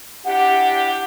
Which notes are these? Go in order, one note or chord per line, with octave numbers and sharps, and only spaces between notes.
D4 E4 G4 F#5